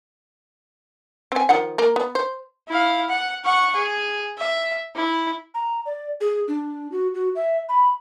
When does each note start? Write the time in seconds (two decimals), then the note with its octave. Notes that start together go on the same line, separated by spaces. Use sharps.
1.32 C4 G#5
1.49 D#3 F3 F#5
1.78 A#3 A#4
1.96 B3
2.15 C5
2.68 E4 F5
3.09 F#5
3.45 F#5 C#6
3.76 G#4
4.38 E5
4.95 E4
5.55 A#5
5.86 D5
6.21 G#4
6.48 D4
6.92 F#4
7.14 F#4
7.35 E5
7.69 B5